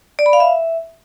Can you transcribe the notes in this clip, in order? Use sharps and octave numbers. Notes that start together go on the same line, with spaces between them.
D5
B5
F5
E5